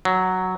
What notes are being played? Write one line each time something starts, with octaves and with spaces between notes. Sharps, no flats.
F#3